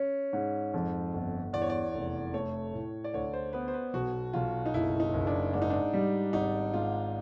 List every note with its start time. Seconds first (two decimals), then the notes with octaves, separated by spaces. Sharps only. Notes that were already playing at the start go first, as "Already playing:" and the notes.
Already playing: C#4
0.33 G#2
0.73 F2
1.13 G1
1.53 E2 D5
1.62 C#5
1.70 D5
1.94 F1
2.33 A3 C#5
2.73 A2
3.04 D5
3.14 D2 C#5
3.33 C5
3.53 B3 B4
3.68 C5
3.74 B4
3.93 B1 F#4
4.33 B1 F4
4.66 D#4
4.74 F#1 E4
5.00 D#4
5.14 F#1
5.27 D4
5.53 G#2 D4
5.62 D#4
5.70 D4
5.93 G3
6.33 G#1 D#4
6.74 G#2 F4